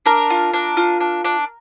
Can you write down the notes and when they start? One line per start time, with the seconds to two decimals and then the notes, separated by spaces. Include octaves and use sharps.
0.06 D4 A#4
0.30 F4
0.54 D4
0.77 F4
1.00 D4
1.24 D4